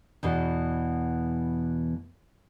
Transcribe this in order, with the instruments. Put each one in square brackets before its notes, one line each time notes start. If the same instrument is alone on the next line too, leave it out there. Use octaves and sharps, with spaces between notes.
[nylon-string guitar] E2 B2 E3